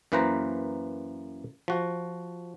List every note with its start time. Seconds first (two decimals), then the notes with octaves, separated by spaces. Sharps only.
0.12 F#2 E3 A#3 B4 C5 A#5
1.68 F3 F#4